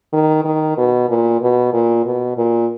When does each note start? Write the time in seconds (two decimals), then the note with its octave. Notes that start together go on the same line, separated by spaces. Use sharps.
0.13 D#3
0.44 D#3
0.78 B2
1.09 A#2
1.41 B2
1.73 A#2
2.06 B2
2.37 A#2